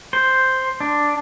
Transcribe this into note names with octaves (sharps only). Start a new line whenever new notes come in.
C5
D4